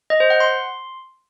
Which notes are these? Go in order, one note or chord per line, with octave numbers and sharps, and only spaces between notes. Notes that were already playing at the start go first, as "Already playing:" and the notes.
D#5
C5
F#5
C6